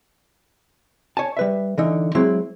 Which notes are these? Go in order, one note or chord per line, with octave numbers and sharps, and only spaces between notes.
C#5 G#5 A5
G3 B4 E5
D3 E3 D#4
F#3 G#3 C4 E4